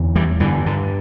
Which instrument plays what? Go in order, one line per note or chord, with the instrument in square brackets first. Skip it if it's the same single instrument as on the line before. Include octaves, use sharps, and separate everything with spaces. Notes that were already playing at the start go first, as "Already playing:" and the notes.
Already playing: [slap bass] E2 D3
E3 G3
G2 D3 E3
D3